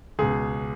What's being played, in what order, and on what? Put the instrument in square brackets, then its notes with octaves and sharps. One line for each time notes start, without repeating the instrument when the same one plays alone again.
[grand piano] C#2 B2 G#4